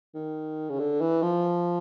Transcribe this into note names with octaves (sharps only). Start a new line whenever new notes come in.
D#3
C#3
D3
E3
F3